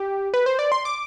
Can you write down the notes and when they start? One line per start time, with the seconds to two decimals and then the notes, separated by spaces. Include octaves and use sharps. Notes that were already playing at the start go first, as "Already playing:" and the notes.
Already playing: G4
0.34 B4
0.46 C5
0.59 D5
0.72 C6
0.85 D6